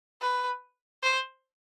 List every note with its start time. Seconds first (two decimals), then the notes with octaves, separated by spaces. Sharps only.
0.21 B4
1.03 C5